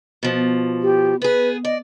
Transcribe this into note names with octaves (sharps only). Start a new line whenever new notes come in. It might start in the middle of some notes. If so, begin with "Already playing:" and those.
B2 F3
G4
B3 G#4 B4
D5 D#5